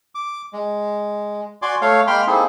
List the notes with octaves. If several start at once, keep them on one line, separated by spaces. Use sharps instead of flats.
D6
G#3
F#4 D5 G#5 C6 D6
A3 C#5 F5
G#3 A#3 G5 B5 C6 F6
A#3 C4 D#4 E4 G#4 A4